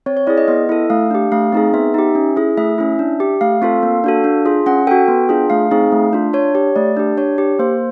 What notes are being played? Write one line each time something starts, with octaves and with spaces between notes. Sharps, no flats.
C4 C#5
C#5
E4 G#4 D5
D#5
B3 D#5
E4 A4
A3 F5
D4 G4
A3 F5
C4 D#4 G#4
B3 E5
D#4 G4
C#4
E4 G#4
A3 E5
C#4 E4
D4
G4
A3 F5
C4 F4 A4
A#3
D4 F#4 A4
D4
F4 G#4
C#4 F#5
F#4 A4 G5
B3
D4 F4 G#4
A3 F5
C4 D#4 G#4
A3
D4 F4
D4 C#5
G4 C#5
A3 D5
D4 G4
D4 C#5
G4
A#3 C5